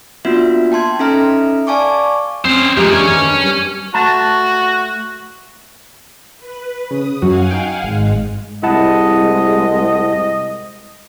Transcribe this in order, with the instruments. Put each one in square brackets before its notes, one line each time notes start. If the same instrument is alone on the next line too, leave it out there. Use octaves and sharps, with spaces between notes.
[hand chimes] A#3 B3 D4 F4 F#4 E5
G5 A5 C6 G#6
C#4 D#4 A4 E5 A#5 F6
D5 F5 G#5 A5 C#6 D6
[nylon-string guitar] C4 [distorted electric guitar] C#4 C5
[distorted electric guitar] F3 A#3 [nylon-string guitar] G#3 G4 E5
[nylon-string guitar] E3 D4 [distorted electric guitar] C#5 G#5
[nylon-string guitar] D#3
D4 B4
G3 B4
[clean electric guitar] A3 A5 [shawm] F#4
[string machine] B4
[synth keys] C#3 [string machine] D#6
[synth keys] F#2 F#3 F#4 [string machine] F5 F#5 G#5
[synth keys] D#4 G5
[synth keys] G#1 [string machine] G#2 G#3
[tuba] C2 [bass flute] G#3 [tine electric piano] E4 F#5 A5 [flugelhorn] D#5